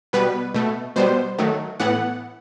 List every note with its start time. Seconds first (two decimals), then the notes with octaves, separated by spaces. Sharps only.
0.13 B2 G3 B3 B4
0.54 B2 A3
0.96 B2 G3 B3 C5
1.38 D#3 F#3 A3
1.80 A2 E3 B3 F#5